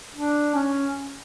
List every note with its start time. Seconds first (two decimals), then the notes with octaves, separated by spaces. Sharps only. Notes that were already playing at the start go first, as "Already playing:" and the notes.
0.15 D4
0.55 C#4